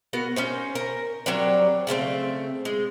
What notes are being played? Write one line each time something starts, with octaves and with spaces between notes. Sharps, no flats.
B3 F#4 A#4
C#4 D#4 C5
A#4
F#3 G3 C4 D4
C#3 A3 A#3 C4
G#3